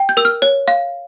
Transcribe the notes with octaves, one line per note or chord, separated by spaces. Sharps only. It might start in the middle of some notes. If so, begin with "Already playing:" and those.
Already playing: G5
G6
A#4 E6
F6
C#5
F5